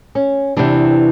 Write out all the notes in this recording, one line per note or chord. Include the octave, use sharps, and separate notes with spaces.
C#4
E2 C3 E3 D4